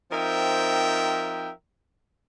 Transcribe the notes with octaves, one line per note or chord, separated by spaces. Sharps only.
F3 C4 D#4 A#4 E5 G5